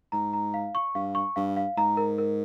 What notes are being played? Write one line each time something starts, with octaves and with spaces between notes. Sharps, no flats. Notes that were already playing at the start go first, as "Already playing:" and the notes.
G#2 A#5
A#5
F5
C#6
G2 F5
C#6
G2 F5
F5
G#2 A#5
A#4
A#4